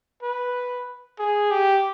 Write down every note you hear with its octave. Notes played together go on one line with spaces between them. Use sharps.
B4
G#4
G4